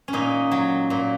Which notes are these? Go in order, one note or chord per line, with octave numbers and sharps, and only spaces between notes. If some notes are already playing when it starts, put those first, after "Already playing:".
C#4
A#2 D#4
F#3
A#2